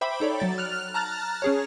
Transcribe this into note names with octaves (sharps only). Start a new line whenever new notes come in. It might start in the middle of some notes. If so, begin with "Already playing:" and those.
C5 E5 G5 B5 D6
D#4 A4 C#5 D5
F#3 A6
F6 F#6 F7
A5 A#5 F6 F#6 A6
C#4 G#4 C#5